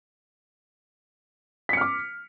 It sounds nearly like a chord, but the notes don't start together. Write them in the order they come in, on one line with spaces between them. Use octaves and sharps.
B6 C#7 F6 D6